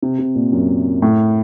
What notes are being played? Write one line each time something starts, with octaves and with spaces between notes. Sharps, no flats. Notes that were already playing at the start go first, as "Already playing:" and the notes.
C3
C3
A#2
F#2
A2